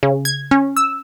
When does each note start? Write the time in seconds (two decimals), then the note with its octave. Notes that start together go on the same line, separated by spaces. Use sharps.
0.03 C#3
0.25 G#6
0.51 C#4
0.77 E6